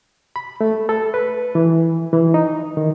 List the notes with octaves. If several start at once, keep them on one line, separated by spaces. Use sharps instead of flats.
B5
A3
A4
B4
E3
E3
D#4
D#3